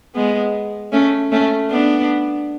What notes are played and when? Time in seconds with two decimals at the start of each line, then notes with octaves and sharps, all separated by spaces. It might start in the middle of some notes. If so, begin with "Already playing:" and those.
0.15 G#3 B3
0.92 A3 C#4
1.32 A3 C#4
1.70 B3 D4